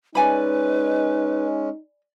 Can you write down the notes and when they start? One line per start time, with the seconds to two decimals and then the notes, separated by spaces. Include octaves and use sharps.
0.15 G#3 C#4 D#4 B4 D5 G#5 B5